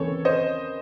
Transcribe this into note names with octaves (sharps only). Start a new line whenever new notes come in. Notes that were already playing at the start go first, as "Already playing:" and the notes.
Already playing: D#2 C#3 E3 C4 A4 C#5
C5 D#5